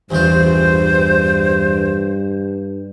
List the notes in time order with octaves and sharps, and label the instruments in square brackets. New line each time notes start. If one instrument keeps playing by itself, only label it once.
[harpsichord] A1 E2 F4 [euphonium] G2 [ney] C5